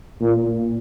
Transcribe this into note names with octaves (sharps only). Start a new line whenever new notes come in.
A#2